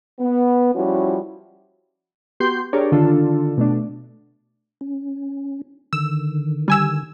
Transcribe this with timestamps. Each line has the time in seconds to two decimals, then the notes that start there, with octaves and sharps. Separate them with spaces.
0.19 B3
0.74 F3 G3 C#4 E4 F#4
2.40 B3 F#4 G4 C6 G6
2.73 D4 G4 G#4 A#4 C#5 D5
2.92 D3 D#3 D4 F4 A4
3.57 B2 A3 D4
4.81 C#4
5.93 D3 D#3 E6
6.68 G3 G#5 E6